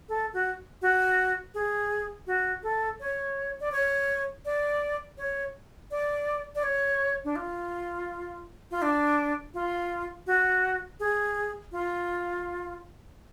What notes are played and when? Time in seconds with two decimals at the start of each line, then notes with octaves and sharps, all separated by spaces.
0.09 A4
0.33 F#4
0.82 F#4
1.54 G#4
2.27 F#4
2.63 A4
3.00 C#5
3.60 D5
3.72 C#5
4.45 D5
5.18 C#5
5.91 D5
6.55 D5
6.63 C#5
7.24 D4
7.36 F4
8.71 F4
8.82 D4
9.54 F4
10.27 F#4
11.00 G#4
11.72 F4